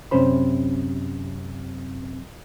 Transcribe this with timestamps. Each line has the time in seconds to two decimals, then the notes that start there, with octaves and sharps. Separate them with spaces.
0.11 F#2 C3 C#4 C5 B5